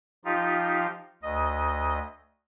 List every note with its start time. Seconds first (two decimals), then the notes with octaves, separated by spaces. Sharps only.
0.25 F3 D#4 F4 G4
1.23 D2 D#5